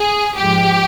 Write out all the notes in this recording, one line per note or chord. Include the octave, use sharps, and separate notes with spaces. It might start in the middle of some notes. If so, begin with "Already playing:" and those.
Already playing: G#4
G#2 F3 G#3 G4